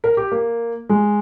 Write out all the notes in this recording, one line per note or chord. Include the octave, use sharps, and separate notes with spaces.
A#4
G4
A#3
G#3